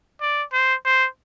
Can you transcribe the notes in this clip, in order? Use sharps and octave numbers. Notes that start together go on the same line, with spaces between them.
D5
C5
C5